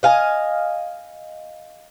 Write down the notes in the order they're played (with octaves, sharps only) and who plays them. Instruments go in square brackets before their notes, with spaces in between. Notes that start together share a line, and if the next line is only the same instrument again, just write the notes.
[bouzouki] D#5 F5 G#5